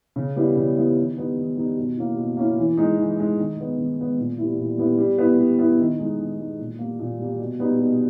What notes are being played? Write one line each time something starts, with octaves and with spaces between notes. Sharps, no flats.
C#3
G3 B3 E4
C#3
G3 B3 E4
D#3
G3 B3 D#4
D#3
G3 B3 D#4
B2
A#3 C#4 E4
B2
A#3 C#4 E4
E3
G#3 D#4
E3
G#3 D#4
D#3
G#3 B3
D#3
G#3 B3
A#2
G3 B3 E4
A#2
G3 B3 E4
G3
B3 E4
G3
B3 E4
D#3
G#3 D#4
D#3
G#3 D#4
A#2
G3 A#3
A#2
G3 A#3
B2
G3 B3 D#4
B2